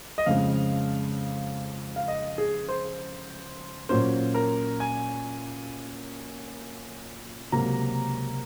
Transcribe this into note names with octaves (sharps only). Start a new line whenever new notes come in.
D#5
F2 C#3 G#3 C4 F5
F5
D#5
G#4
C5
A#2 F#3 A#3 C#4 C5
A#4
G#5
C#2 C3 F#3 A#3 A#5